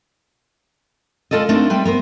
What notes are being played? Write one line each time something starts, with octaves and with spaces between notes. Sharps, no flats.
G#3 F4 A4 D5 D#5
A3 C4 D4 D#4 F4 A#4
G3 C4 B4
B3 A#4 C5